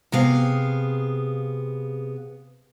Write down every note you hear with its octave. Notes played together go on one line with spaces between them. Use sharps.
C3 B3 G#4 F5